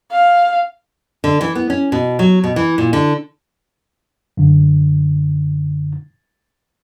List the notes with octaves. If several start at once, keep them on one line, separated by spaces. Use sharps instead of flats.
F5
D3
E3
B3
C#4
B2
F#3
B2
E3
A#2
D3
F#2 D3